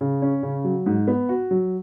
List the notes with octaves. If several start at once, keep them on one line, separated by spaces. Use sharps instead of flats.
C#3
C#4
C#3
F#3
G#2
B3
F#4
F#3